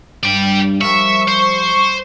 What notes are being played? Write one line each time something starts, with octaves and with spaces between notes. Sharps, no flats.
G2 D5 G5
F3 G3 A#4 E5 C#6
C5